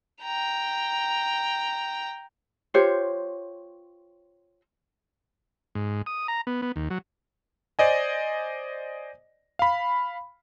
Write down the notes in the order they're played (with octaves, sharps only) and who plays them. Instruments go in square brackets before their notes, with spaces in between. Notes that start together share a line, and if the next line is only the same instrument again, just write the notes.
[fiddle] G5 A#5
[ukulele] F4 G4 C5 C#5
[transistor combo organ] G#2
D#6
A#5
B3
B3
D#2
F#3
[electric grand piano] C5 D5 D#5 G#5
F5 B5